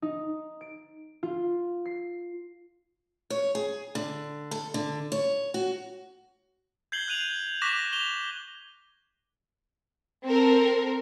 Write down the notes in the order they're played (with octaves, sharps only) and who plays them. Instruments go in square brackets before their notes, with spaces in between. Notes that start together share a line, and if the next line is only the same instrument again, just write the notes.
[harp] D#4
D7
F4
C7
[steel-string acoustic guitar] C#5
G#4
D3
A4
D3
C#5
F#4
[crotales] G6 G#6 C7 F#7 G7
F#6 G6 D#7 F7 F#7
C#6 D6 F#6 A#6 B6 E7
F7 G7
[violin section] C4 A4 A#4